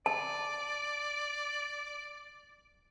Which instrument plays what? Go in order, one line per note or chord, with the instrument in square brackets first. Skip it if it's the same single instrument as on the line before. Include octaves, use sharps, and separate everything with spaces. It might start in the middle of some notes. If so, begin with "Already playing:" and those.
[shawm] D5 [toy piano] A5